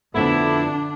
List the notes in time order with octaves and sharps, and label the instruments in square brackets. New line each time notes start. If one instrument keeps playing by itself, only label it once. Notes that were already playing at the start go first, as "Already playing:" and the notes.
[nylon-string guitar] F2 A3 B3 [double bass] D3 D4 [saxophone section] E4